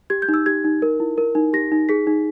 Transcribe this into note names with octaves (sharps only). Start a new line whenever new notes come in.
G4 G#6
G6
D#4
E6
G4 G#6
D#4
A#4
E4
A#4
D#4
G4 A#6
D#4
G#4 B6
D#4